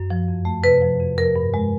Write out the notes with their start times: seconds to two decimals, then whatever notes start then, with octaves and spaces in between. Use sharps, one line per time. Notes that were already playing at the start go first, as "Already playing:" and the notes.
Already playing: F#2
0.10 F3
0.28 F2
0.45 A3
0.63 C3 B4
0.82 F3
1.00 F2
1.18 F3 A#4
1.36 G2
1.54 G#3